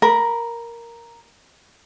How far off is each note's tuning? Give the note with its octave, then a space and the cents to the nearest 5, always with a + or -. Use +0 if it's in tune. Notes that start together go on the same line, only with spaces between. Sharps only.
A#4 +0 B5 -15